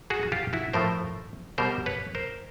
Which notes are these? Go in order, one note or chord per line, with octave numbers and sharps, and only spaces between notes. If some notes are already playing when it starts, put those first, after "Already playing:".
F#4 G#4
F#4
F4 G4
E4 F#4
A2 F3 A3 A#4 C5
B2 G3 A#4 C5
B4 C#5
A#4 C5